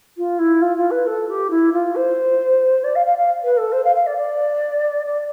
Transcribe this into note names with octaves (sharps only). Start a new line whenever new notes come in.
F4
E4
F4
F4
B4
A4
G4
E4
F4
C5
D5
F5
F5
F5
B4
A4
C5
F5
F5
D5
D5
D5